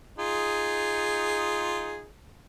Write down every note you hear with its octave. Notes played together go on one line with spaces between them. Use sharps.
D#4 F4 G#4